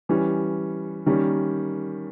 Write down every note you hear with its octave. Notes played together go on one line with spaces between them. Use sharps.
E3 G3 C#4
D#3 G3 A#3 C#4